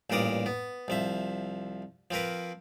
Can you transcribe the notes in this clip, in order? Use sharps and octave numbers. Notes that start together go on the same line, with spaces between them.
A1 G2 A#2 A#4 D5 D#6
B3
C2 F3 E5
F3 C4 A#4 B4